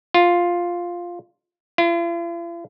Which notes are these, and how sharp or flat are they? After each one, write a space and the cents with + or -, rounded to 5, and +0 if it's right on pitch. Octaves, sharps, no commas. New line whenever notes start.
F4 +5
F4 -45